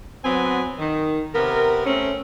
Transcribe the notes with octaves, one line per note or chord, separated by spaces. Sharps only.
F#3 B3 C4 G#5
D#3
C3 B3 A#4
A3 C4 C#4